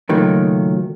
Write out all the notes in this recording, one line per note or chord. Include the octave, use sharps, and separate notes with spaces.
C#2 A#2 D#3 F#3 A3